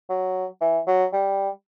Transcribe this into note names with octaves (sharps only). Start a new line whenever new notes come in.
F#3
E3
F#3
G3